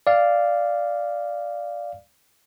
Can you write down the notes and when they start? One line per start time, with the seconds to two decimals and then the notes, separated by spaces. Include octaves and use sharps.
0.07 D5 F5